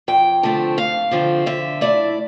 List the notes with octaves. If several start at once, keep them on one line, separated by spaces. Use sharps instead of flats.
F2 G5
D3 F3 A3 C4
F2 F5
D3 F3 A3 C4
D3 E5
A3 E4 D5